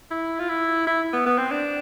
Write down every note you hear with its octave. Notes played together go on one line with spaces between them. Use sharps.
E4
F4
E4
E4
B3
B3
C4
D4